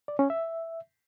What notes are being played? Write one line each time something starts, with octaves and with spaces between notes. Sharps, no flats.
D5
C#4
E5